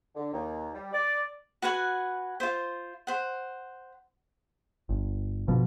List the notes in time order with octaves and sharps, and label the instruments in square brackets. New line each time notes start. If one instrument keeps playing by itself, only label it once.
[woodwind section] D3
D#2
G3
D5
[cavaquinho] F#4 B4 F#5 G#5
F4 C5
C5 F#5
[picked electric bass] G1
G1 B2 F3